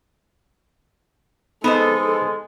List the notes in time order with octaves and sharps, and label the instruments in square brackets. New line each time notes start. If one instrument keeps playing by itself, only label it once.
[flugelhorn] G#3 [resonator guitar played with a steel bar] B3 C5 D#5 [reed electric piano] D#4 [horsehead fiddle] A4